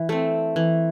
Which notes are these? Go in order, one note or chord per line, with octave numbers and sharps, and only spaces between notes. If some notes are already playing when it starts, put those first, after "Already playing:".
Already playing: E3
A3 C4
E3